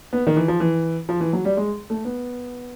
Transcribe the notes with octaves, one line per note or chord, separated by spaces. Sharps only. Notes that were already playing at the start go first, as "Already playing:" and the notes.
B3
D#3
E3
F3
E3
F3
E3
F#3
G3
G#3
A3
B3